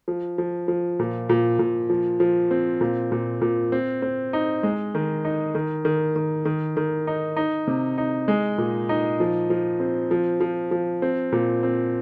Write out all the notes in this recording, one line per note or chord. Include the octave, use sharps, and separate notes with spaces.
F3
F3
F3
A#2
A#2
A#2
F3
F3
C4
A#2
A#2
A#2
C4
C4
D#4
G#3
D#3
D#4
D#3
D#3
D#3
D#3
D#3
D#4
D#4
C3
D#4
G#3
A#2
D#4
F3
F3
C4
F3
F3
F3
C4
A#2
C4